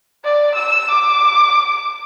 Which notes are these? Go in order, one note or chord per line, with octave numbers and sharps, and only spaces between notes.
D5
E6
D6